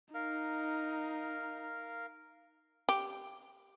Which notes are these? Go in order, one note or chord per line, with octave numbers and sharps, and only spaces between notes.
D#4 A#4 F5
G4